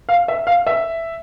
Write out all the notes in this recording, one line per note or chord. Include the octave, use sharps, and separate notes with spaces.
F5
E5
F5
E5